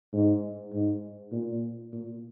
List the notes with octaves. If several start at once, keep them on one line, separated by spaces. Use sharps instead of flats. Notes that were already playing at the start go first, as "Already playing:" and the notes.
G#2
G#2
A#2
A#2